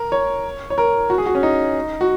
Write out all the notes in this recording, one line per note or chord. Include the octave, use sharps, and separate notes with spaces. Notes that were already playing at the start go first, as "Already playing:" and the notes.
Already playing: A#4
C#5
C#5
A#4
F#4
G#4
F#4
C#4
D#4
F#4